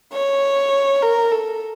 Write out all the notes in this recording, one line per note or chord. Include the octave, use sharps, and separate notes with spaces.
C#5
A#4
A4